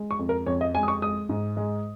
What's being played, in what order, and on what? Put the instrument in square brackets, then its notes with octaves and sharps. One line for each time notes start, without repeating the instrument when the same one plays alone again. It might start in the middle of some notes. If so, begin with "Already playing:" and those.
Already playing: [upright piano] G#3
C#6
F2
A#4
F2 C#5
D#5
G#3 G#5
D#6
C#6
G#3 D#6
G#2
G#3